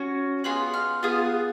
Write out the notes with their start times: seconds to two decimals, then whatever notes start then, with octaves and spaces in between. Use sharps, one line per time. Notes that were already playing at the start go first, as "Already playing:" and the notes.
Already playing: C#4 F#4
0.44 B3 F4 G#4 F#6
0.74 F6
1.03 B3 F4 G#4 D#6